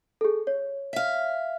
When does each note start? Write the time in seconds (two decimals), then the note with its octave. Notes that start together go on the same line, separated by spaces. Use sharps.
0.21 G#4 A4
0.47 C#5
0.93 E5 F5